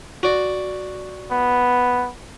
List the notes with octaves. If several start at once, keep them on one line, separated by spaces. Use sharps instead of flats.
F#4 D5
B3